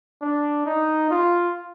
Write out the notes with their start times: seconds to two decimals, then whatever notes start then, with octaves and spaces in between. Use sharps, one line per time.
0.22 D4
0.66 D#4
1.10 F4